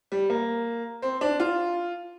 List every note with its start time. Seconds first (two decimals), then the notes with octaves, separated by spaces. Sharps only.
0.12 G3
0.30 A#3
1.02 C4
1.21 D4
1.40 F4